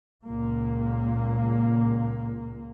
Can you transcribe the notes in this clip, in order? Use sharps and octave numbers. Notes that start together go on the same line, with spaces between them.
C#2 A#2 A#3